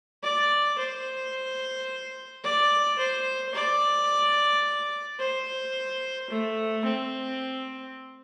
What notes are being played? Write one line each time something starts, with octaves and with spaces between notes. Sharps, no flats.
D5
C5
D5
C5
D5
C5
A3
C4